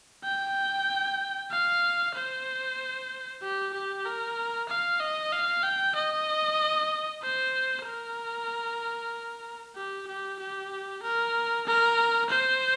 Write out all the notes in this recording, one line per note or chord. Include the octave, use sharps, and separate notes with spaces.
G5
F5
C5
G4
G4
A#4
F5
D#5
F5
G5
D#5
C5
A#4
G4
G4
G4
A#4
A#4
C5